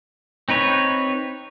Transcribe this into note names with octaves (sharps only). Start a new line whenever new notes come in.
C4 D#4 B4 C#5